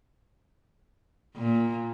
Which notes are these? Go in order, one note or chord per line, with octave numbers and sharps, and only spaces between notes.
A#2